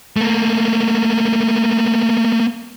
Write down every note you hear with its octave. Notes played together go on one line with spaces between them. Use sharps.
A3 A#3